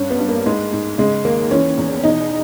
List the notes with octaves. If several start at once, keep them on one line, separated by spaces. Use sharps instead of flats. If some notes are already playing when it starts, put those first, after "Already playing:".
Already playing: G2 C#4
B3
G2
A#3
G#2 G#3
G#2
C#3 G#3
D#2 A#3
E3 C#4
E2
B2 D#4